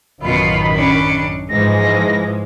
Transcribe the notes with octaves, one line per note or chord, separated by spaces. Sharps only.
A1 F#2 B2 D#3 F4 B5
C#4 D4
G#2 E3 F3 G#3 A#6